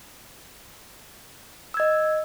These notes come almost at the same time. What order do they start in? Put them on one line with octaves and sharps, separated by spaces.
E6 G#6 D#5